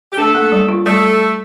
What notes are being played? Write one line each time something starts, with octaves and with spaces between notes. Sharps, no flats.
G4
A3 D4 A4
A#3
G3
F4
G3 A3 A4